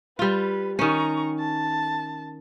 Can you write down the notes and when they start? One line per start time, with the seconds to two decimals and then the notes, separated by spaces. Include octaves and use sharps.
0.19 G3 F4 B4
0.79 D#3 C#4 A#5 C#6
1.40 A5